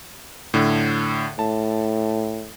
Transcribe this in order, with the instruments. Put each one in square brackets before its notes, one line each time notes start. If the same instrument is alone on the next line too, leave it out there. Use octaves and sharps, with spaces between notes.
[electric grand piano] A2 D3
[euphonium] A2 [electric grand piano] A5